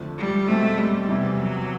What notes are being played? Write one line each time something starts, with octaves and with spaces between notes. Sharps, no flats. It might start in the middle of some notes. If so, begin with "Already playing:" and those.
Already playing: F2 D3 F3 A3
G3
E2 B2 G#3 A3 C4 E4
G3
F1 E2 C3 E3
F#3